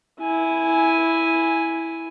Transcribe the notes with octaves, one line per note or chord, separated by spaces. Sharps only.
E4 G#5